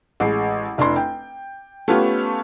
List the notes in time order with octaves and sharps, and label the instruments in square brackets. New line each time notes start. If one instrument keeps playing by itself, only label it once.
[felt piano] A1 G#3 C7
F1 D4 E4 C6
G5
A3 B3 C#4 F4 G4